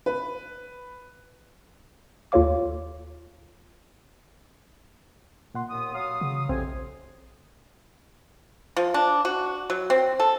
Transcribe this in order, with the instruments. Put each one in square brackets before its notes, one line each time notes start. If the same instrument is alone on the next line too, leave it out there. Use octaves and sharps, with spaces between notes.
[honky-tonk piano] B4
[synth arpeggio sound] D#2 F4 A4 C#5 F5 D6
[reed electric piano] A#2 F#5 C6
[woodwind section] D#2 B3 D#6
F#3 F5 D#6
[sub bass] C#3
[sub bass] A#1 [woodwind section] F2 C3 G#5 [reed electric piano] C4
[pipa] F3
D4
F#4
F#3
C4
A4